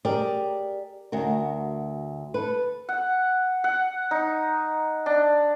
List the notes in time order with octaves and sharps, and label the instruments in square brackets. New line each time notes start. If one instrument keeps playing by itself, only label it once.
[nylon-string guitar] G4 G#4 A#4 D5
D2 F#4 A#4
A4 B4
[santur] F#5
F#5
D#4
D4